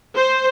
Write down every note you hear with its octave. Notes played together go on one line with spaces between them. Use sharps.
C5